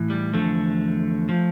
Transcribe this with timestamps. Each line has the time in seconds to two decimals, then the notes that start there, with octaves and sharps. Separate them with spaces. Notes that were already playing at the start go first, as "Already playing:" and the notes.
Already playing: A2 E3
0.10 G3
0.34 E2 D3 F3 A3
1.29 F3